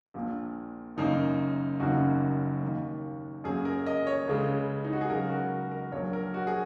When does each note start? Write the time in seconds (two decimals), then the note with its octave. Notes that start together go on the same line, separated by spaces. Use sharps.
0.14 A#1 A#2 A#3
0.97 F#1 F#2 D#3 A#3 D#4
1.80 F#1 F#2 D#3 A#3 F#4
2.63 D#2 D#3 A#3
3.44 F#2 F#3 A#3 G#4
3.65 A#4
3.86 D#5
4.07 C#5
4.28 C#2 C#3 G#3
4.84 D#4
4.93 F#4
5.01 G#4
5.09 C#2 C#3 F#3 A#4
5.30 F#4
5.72 A#4
5.92 A#1 A#2 F#3 C#5
6.13 A#4
6.34 F#4
6.47 G#4